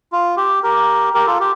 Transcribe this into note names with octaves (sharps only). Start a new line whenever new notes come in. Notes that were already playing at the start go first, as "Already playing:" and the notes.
F4
G4
G4 A#4
G4 A#4
F4 A4
G4